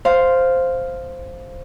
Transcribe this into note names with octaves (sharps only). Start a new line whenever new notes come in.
C5 F5